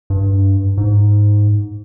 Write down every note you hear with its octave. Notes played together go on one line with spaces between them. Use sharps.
G2
G#2